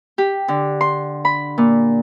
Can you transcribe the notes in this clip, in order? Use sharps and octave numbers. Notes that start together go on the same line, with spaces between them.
G4
D3
C6
B5
A#2